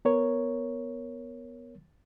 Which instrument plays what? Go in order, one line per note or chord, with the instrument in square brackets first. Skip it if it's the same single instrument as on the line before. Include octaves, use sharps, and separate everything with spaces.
[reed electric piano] B3 A#4 C#5